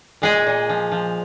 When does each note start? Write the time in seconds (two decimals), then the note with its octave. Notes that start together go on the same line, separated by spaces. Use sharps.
0.22 A#2 G#3 G#4
0.47 A#2
0.69 F3
0.92 F3